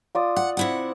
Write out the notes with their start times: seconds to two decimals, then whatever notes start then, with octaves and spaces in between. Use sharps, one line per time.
0.15 F4 D5 D#6
0.36 F#5
0.57 C3 E4 F#5